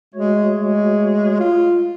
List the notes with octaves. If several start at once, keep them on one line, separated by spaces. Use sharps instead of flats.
G#3 A3 F#4 C#5
G#3
F4